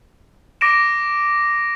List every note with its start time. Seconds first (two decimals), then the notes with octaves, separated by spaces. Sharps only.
0.61 D6 A#6 D7 E7